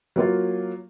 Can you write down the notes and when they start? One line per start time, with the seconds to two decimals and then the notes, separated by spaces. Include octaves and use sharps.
0.16 F#3 A#3 F4